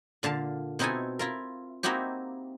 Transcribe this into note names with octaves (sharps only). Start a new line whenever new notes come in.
A#2 D3 F5 A5
B2 C4 D#4 E4 A4 G#5
E4 F4 A#4
A#3 C4 D#4 E4 F#4 G4